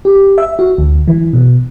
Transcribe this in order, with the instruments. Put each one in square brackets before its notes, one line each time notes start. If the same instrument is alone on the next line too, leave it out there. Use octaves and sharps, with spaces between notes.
[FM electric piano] G4
E5
F#4
D2
E3
B2